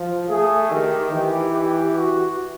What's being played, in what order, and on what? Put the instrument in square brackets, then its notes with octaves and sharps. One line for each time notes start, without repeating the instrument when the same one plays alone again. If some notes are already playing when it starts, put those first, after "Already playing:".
Already playing: [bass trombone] F3
[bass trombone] A3 [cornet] G#4
[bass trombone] D#3 [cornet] G4
[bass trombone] E3 [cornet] G4
[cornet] G4
F#4